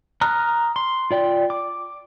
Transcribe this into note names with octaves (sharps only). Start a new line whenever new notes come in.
A#5 D#6 F6 F#6
C6
F4 D5 G5
D6